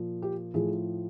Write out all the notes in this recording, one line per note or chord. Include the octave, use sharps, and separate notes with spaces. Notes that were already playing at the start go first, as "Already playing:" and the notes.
Already playing: A#2 F3
G4
A2 F3 G#4